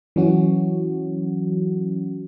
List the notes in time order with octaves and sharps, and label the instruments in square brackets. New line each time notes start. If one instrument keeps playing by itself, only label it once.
[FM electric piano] E3 F#3 C#4 F#4